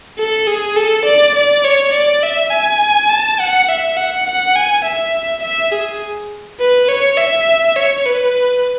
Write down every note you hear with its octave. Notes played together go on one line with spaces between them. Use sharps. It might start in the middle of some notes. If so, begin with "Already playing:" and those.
A4
G#4
A4
D5
D5
C#5
D5
E5
G#5
A5
F#5
E5
F#5
F#5
G#5
E5
E5
G#4
B4
C#5
E5
C#5
B4